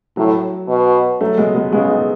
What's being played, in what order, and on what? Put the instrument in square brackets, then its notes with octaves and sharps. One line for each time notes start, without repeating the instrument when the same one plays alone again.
[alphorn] A2 [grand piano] F#3
[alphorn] B2
[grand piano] F#3 A3
G#3 B3
G#3 B3
[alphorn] C#3 [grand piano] G#3 B3
[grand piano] B3 D#4